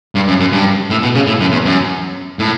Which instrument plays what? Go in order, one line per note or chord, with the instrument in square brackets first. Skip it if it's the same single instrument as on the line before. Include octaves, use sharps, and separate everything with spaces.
[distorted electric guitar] G2
F#2
F#2
G2
A2
B2
C#3
A2
F#2
E2
F#2
A2